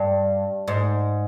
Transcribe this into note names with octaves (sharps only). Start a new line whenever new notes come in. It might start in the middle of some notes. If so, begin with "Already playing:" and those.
Already playing: G2
G#2